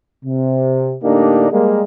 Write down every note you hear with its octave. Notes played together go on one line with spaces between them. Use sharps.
C3
A2 D3 A#3 D4 D#4 G4
G3 G#3 A#3